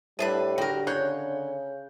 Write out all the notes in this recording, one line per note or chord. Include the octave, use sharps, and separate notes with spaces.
A2 D3 G3 D4 B4
D3 F#4 G4 A#4 G5
C#3 C#5 F#6 G6